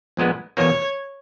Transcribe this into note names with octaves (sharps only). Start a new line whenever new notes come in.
A#1 A#2 G#3 B3
E2 B2 A#3 C#5